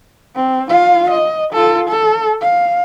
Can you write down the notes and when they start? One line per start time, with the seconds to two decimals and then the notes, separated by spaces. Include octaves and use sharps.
0.36 C4
0.69 F4 F5
1.10 D#5
1.53 F4 A4
1.89 A4
2.41 F5